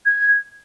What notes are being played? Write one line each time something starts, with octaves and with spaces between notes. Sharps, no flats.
G#6